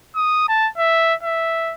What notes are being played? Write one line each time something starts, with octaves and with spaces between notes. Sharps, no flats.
D#6
A5
E5
E5